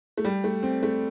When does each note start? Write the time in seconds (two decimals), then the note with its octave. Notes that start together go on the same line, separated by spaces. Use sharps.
0.17 A3
0.25 G3
0.44 A3
0.63 C4
0.83 A3